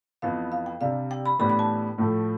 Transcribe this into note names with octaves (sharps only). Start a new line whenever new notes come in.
F2 E3 B3 F5
F5
G5
C3 G3 D4 F5
G5
B5
A2 E3 B3 D4 G4 B5
B5
A5
A2 F3 A3